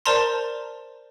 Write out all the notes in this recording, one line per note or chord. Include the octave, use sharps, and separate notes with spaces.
A#4 C5 D5 A5 A#5 C6